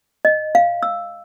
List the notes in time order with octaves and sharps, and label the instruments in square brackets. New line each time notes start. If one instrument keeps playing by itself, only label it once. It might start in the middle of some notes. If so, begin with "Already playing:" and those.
[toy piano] D#5
F5
E6